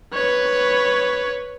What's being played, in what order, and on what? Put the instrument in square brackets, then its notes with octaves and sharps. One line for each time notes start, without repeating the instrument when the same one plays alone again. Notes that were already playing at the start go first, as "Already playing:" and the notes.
[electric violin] B4 C#5